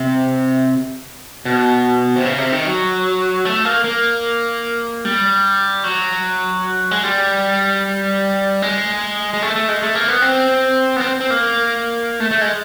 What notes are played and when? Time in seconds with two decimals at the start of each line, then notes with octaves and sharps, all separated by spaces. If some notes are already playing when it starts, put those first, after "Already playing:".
Already playing: C3
1.45 B2
2.16 C3
2.25 C#3
2.38 C3
2.52 D#3
2.65 F#3
3.45 A3
3.65 A#3
3.84 A#3
5.05 G3
5.84 F#3
6.91 G#3
7.03 G3
8.62 G#3
9.34 G#3
9.42 A3
9.56 A3
9.68 G#3
9.82 A3
9.95 A#3
10.08 B3
10.22 C4
10.96 B3
11.01 C4
11.20 C4
11.30 A#3
12.20 A3
12.31 A3
12.41 G#3